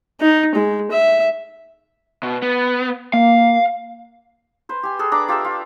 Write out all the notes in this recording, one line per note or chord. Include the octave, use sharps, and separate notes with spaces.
D#4
G#3
E5
B2
B3
A#3 F5
B4 C5
G4 G#5
G#4 A4 B4
D4 A#5 B5 D6
F4 G4 A4 E5
F4